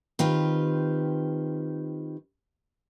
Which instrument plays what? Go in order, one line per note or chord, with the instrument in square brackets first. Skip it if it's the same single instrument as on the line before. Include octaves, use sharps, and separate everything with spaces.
[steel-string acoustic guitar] D#3 C4 F4 G4 B4